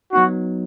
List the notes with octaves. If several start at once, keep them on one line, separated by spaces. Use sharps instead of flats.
F#3 B3 D#4 F#4